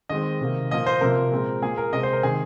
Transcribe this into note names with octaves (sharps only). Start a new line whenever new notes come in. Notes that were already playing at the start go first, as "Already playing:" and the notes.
D#3 G#3 C4 D#5
C3 D#3 A#3
A#2 F3 A#3 D#5
C5
C3 F3 A#3 A#4
A#2 G#3 C4
A#2 A#3 G#4
A#4
C3 G#3 C4 D#5
C5
A#4
C3 D#3 G#3 C4 G#4